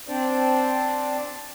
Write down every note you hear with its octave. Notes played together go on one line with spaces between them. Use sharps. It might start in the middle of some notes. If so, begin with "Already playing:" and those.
C4 D4 C5 D5